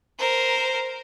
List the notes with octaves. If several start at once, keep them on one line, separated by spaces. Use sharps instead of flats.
A#4 C5